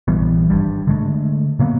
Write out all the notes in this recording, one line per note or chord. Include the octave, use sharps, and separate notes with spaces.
A#1 E3 G3 B3
G#1 G2 G3
D3 G#3 A3
C3 F#3 A#3 B3